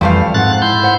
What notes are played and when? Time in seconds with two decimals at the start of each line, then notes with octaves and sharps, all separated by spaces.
0.01 F2 E3 F3 G3 A3 F5
0.34 G#2 C4 G#4 F#5 F#6 A6
0.62 E4 C6 G6
0.83 C5 F#5